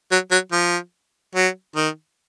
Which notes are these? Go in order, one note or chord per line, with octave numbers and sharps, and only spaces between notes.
F#3
F#3
F3
F#3
D#3